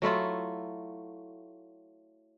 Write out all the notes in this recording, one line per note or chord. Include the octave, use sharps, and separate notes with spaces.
F#3 A3 E4 F4